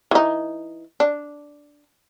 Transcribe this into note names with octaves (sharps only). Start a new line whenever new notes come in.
E3 D#4
D4